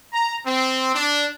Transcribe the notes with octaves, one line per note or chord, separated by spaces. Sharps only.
A#5
C4
D4